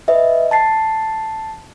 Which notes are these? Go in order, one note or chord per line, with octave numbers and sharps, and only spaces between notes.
B4 D#5 E5
A5 A6 C7